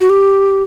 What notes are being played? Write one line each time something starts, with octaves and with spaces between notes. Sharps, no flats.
F#4
G4